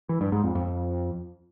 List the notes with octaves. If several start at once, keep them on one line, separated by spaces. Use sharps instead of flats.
E3
G2
G#2
F2
F2